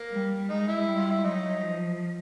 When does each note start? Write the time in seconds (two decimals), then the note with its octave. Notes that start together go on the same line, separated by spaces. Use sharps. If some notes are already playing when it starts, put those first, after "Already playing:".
Already playing: A#3
0.12 G3
0.50 G#3 D#4
0.68 E4
0.87 G3
0.96 F4
1.11 E4
1.24 F#3 D#4
1.61 F3